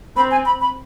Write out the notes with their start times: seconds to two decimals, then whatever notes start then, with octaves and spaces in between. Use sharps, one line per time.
0.16 C4 B5
0.31 G#5
0.46 B5
0.61 B5